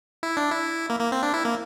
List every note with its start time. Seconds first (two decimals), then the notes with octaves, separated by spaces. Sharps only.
0.23 E4
0.37 D4
0.51 E4
0.90 A#3
1.00 A#3
1.12 C4
1.23 D4
1.34 E4
1.45 A#3